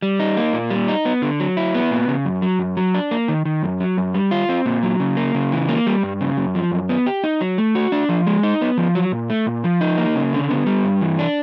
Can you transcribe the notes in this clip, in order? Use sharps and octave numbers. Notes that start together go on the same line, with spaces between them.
G3
D#4
A#3
A#2
G3
D#4
B3
D3
F#3
E4
B3
A#2
C#3
F#2
F#3
F#2
F#3
D4
A#3
D#3
D#3
F#2
F#3
F#2
G3
F4
C4
A#2
F#3
C#3
A#3
C#3
E3
A#3
G3
G2
C#3
F#2
F3
F#2
B3
G4
D#4
F#3
A3
F#4
D4
F3
G#3
D#4
B3
F3
F#3
A#2
A3
A#2
F3
D#4
A#3
C#3
D3
B3
G3
G2
E3
D4